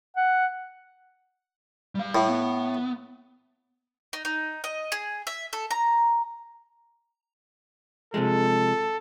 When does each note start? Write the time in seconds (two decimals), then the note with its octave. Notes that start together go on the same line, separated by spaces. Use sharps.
0.16 F#5
1.95 G3 F5
2.15 A2
2.28 B3
4.13 D#4
4.25 D#4
4.64 D#5
4.92 G#4
5.27 E5
5.53 A4
5.71 A#5
8.14 C3 F3 G#3 A4